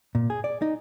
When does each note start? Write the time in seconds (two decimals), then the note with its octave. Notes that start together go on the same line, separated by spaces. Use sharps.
0.15 A#2
0.30 G#4
0.44 D5
0.62 D#4